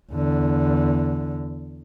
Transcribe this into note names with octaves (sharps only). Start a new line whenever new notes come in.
E2 D3